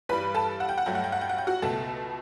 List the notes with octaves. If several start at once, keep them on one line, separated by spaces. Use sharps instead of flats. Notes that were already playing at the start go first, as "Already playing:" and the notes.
G2 E3 G3 B4 B5
A4 A5
F#5
G5
F#5
G2 F#3 A3 G5
F#5
G5
F#5
G5
F#5
G5
F#4 F#5
C#2 B2 A3 A4 A5